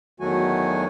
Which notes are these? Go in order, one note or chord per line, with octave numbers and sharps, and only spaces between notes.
E2 D#3 F#3 A3 F#4 G#5